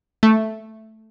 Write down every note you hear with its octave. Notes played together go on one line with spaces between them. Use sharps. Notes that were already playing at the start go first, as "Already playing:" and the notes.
A3